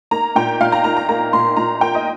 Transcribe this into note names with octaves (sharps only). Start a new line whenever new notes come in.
A#3 A#5
A#2 G5
A#2 F5
A#5
A#3 A#5
A#5
A#3 A#5
A#2 C6
A#2 A#5
A#3 G5
D#5